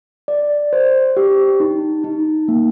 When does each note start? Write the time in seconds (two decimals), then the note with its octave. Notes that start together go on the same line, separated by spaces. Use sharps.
0.28 D5
0.73 C5
1.17 G4
1.60 D#4
2.04 D#4
2.48 A#3